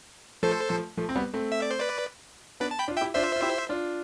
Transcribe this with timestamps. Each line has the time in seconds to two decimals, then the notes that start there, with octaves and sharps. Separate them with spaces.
0.43 F3 A3 A4 C5
0.70 F3 A3
0.97 F3 A3
1.09 C4
1.16 G3 B3
1.34 A3 C4
1.52 E5
1.62 D5
1.71 C5
1.80 B4 D5
2.60 B3 D4 B4 D5
2.71 A5
2.79 G5 B5
2.88 D4 F4
2.97 E5 G5
3.01 E4 G4
3.15 D4 F4 C5 E5
3.36 F4
3.42 E4 G4
3.69 D4 F4